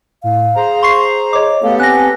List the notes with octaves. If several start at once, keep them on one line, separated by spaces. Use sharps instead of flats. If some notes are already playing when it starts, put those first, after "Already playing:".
A2 F5
G#4 C5 A#5
C6 C#6 C7
C#5 D#5 D6
A3 B3 G4 A4 F5
C4 G#5 F#6 A#6